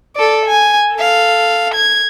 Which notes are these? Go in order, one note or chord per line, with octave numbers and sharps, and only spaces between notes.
A4 D5
G#5
A4 F5
G#6